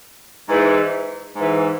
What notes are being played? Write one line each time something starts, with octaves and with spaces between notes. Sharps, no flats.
G#2 E3
G#2 E3